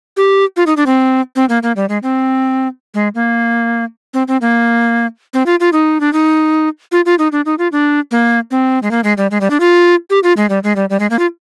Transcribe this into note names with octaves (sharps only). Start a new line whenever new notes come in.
G4
F4
D#4
D4
C4
C4
A#3
A#3
G3
G#3
C4
G#3
A#3
C4
C4
A#3
C4
F4
F4
D#4
D4
D#4
F4
F4
D#4
D4
D#4
F4
D4
A#3
C4
G#3
A#3
G#3
G3
G#3
G3
D4
F4
G4
F4
G#3
G3
G#3
G3
G3
G#3
A#3
F4